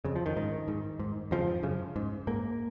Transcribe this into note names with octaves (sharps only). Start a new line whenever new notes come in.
F2 C#3
F3
D#3
G#2 D#3
G#2
G#2
F2 C#3 F3
F#2 C#3
G#2
G#2 A#3